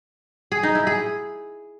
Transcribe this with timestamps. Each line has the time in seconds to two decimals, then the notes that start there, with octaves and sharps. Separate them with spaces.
0.52 G#4
0.63 D#4
0.75 E4
0.87 G#4